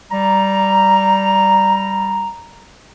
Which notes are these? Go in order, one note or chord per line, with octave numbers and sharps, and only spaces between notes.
G3 A#5